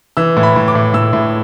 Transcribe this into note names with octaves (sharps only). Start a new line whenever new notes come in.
E3 E6
A2
B5
A2
D6
A2
A2 E6
A2